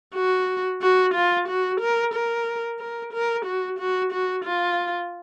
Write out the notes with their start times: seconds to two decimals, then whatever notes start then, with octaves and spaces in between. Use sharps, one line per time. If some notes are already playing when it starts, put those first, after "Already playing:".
0.15 F#4
0.82 F#4
1.14 F4
1.48 F#4
1.81 A#4
2.14 A#4
2.79 A#4
3.13 A#4
3.45 F#4
3.79 F#4
4.12 F#4
4.45 F4